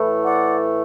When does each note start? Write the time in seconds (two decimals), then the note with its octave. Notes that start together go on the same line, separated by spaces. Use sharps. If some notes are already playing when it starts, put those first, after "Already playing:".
Already playing: A2 E3 A3
0.25 D5 F#5